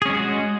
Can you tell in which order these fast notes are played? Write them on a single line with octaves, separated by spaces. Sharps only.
G#4 C#4 G#3 F#4